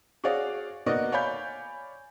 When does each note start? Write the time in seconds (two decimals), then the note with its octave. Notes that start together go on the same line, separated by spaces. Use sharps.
0.24 F#4 G#4 C#5 D5 F5
0.86 A#3 B3 D#4 F#4 D5 D#5
1.12 C#5 D5 F5 G#5 B5 G6